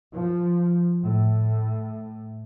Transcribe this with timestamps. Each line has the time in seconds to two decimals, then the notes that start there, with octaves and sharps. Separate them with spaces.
0.14 F3
1.01 A2